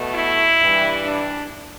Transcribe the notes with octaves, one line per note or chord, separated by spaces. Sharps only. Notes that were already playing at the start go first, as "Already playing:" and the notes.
Already playing: B2 A3
E4
G2 E3 G3
D4